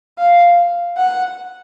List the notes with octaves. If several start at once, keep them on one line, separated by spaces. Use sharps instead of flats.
F5
F#5